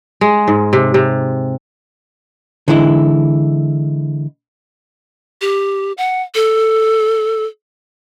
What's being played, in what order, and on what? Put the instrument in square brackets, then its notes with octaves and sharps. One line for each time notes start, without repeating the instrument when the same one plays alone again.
[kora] G#3
G#2
C3
C3
[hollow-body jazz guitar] D3 E3 G#3 E4
[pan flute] G4
F#5
A4